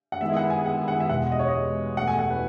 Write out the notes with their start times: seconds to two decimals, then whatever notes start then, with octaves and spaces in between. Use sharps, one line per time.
0.12 F#5
0.21 D#3 G#3 B3 E4 G#4 E5
0.37 F#5
0.50 G#5
0.66 F#5
0.88 F#5
1.00 E5
1.10 E2 B2 G#3 F#5
1.32 D#5
1.39 C#5
1.48 D#5
1.97 E2 B2 A3 F#5
2.07 G#5
2.19 F#5
2.30 B4